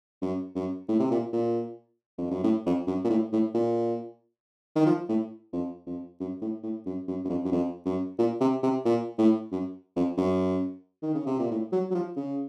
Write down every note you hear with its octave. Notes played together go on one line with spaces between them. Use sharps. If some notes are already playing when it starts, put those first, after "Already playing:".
F#2
F#2
A2
C3
A#2
A#2
F2
F#2
A2
F2
F#2
A#2
A2
A2
A#2
D#3
F3
A2
F2
F2
F#2
A2
A2
F#2
F#2
F#2
F2
F#2
F2
F#2
A#2
C3
C3
A#2
A2
F#2
F2
F#2
D#3
C#3
C3
A#2
A2
F#3
F#3
F3
C#3